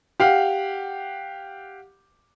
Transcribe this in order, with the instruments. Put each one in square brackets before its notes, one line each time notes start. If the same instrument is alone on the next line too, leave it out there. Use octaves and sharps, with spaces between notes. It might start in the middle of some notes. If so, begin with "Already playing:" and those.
[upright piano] G4 F5 F#5